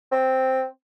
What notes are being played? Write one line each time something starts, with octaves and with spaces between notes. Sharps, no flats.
C4